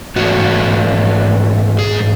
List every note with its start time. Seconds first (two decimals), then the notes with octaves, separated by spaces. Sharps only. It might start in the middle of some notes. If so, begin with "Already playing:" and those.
0.16 G#2 E3 A3 F#4
1.79 G#4